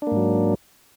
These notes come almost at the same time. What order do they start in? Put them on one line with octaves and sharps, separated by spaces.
D4 A#3 G#2 F#3